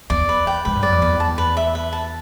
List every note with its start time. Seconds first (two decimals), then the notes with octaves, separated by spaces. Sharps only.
0.10 E2 D5
0.29 B4
0.47 G5
0.65 G#2 B4
0.75 G2
0.83 F#2 D5
0.92 F2
1.02 E2 B4
1.20 A5
1.38 B4
1.57 E5
1.75 B4
1.93 A5